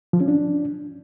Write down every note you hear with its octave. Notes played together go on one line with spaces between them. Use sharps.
F3
C#4
D4